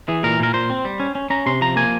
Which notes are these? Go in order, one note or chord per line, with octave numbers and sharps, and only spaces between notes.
E3 G#4
A#2 A#4
A#2 A#4
A#2 C5
C4
G3
C#4
C#4
C#4 A#5
C3 C6
F3 A#5
A#3 G#5